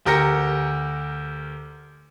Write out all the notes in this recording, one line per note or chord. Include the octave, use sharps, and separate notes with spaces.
D2 G4 A#4 A#6 C#7